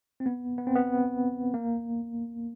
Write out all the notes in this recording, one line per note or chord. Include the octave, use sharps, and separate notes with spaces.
C4
B3
B3
C4
B3
A#3